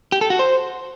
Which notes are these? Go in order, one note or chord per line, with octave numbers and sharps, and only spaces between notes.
G4
A4
F#4
C5